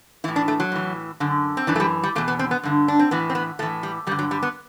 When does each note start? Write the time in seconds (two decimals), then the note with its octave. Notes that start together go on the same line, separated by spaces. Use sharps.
0.24 A2 E3 E4
0.36 D4
0.48 A3
0.60 F#3
0.72 A2 E3
1.20 F#2 D3
1.57 C4
1.67 F#2 E3 D4
1.76 A3
1.80 G3
2.03 G3
2.15 E2 B2 A3
2.28 B3
2.39 C4
2.51 B3
2.63 G2 D3
2.88 D4
2.99 C4
3.11 A2 E3 B3
3.30 C4
3.35 B3
3.59 A2 E3 A3
3.83 G3
4.07 G2 G3
4.11 D3
4.19 F#3
4.31 G3
4.43 B3